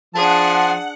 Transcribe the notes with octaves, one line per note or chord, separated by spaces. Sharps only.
F3 D4 G#4 F#5 A5